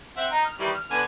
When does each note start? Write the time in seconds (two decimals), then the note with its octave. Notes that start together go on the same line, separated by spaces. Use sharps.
0.17 C4 E5 F#5
0.32 D#4 A#5
0.45 F6
0.59 D#3 E3 G3
0.75 F6
0.91 D3 B3 G#5